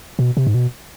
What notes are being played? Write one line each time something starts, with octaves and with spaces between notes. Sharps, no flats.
B2
C3
G#2
B2